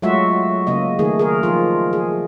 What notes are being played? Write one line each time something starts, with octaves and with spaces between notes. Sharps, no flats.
F#3 G#3 A3 F4 F#4 E5
C#3 A#3 D#5
D#3 A3 G#4
G#4 A#4
F3 F4
G#4